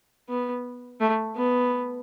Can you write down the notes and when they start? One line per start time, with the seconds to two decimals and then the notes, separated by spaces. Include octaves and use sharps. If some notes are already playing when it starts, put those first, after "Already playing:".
0.29 B3
1.00 A3
1.36 B3